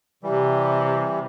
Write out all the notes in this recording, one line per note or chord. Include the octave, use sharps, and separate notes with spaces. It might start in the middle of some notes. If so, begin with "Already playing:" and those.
C3 E3 G3